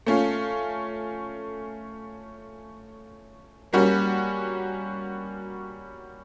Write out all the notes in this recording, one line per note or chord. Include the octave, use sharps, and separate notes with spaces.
A3 C#4 F4
G3 A#3 C#4 F#4